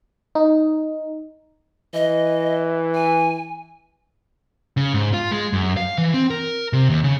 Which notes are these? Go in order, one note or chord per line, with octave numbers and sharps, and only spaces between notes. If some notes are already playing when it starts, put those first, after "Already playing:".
D#4
E3 D#5
G#5
C#3
G#2
F4
G#3
F#2
F5
E3
C4
A#4
C3
D#2
C#3